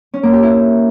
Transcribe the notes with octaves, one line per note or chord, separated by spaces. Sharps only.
C#4
A#3
G4
E4